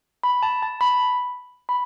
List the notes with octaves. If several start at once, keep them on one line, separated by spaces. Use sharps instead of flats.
B5
A5
A5
B5
B5